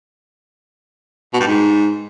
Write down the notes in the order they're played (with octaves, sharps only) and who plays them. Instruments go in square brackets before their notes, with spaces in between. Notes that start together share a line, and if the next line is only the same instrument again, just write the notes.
[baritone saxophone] B2
G2
G#2